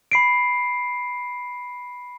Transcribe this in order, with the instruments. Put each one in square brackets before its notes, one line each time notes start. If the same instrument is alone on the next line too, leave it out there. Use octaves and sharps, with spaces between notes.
[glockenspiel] B5 C7 D7